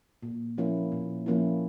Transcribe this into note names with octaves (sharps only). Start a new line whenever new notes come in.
A#2
F3 A#3 C#4 E4
A#2
F3 A#3 C#4 E4